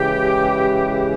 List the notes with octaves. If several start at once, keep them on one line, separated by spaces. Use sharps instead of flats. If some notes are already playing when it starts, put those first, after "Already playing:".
Already playing: C#3 E3 G#3 G4